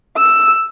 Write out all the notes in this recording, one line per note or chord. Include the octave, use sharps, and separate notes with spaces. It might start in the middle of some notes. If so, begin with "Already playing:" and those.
E6